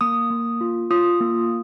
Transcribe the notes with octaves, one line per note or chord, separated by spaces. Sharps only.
A#3 D#6
A#3
F4
F4 D#6
A#3